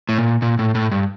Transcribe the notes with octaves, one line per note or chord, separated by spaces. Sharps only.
A2
A#2
A#2
A2
A2
G2